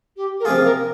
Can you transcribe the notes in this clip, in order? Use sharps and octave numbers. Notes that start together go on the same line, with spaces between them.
G4
A#4
C3 F3 A#3 F4 G#4
A#4